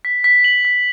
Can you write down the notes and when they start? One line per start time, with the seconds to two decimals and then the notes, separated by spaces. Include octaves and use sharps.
0.05 B6
0.24 B6
0.44 F#7
0.65 B6